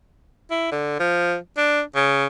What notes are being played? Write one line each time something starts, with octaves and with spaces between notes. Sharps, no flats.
E4
D3
F3
D4
C#3